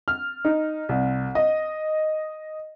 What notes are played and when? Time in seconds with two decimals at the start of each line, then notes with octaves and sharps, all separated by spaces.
0.08 F6
0.45 D#4
0.89 C2
1.35 D#5